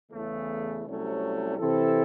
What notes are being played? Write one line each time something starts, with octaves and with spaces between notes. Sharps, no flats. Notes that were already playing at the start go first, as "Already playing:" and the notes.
E2 C#3 E3 A3
C2 C3 F#3 A3 C#4
C3 E3 C4 E4 A4